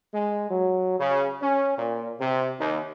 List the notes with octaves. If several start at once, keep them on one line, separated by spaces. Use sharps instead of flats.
G#3
F#3
C#3
C#4
A#2
C3
D#2